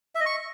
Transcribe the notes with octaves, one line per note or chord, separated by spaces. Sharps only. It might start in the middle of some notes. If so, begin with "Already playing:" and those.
E5
D#5
C#6